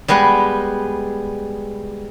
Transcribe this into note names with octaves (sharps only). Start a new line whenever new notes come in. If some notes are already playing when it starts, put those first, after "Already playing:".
G3 G#3 B3 B4